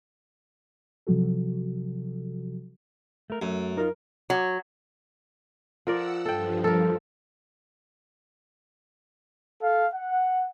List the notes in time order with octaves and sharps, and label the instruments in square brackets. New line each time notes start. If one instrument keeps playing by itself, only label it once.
[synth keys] C3 F3 F#3 F#4 A4
[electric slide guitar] A3 A#4
[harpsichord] F#2 [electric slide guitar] A3
[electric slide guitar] D#4 F4 [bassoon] A#4
[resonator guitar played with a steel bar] F#3
[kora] F3 A#4 D5 [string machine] F#5 E6
[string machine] G2 F3 [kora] A4 G5
[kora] A4 A#4
[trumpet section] A4 F5
F#5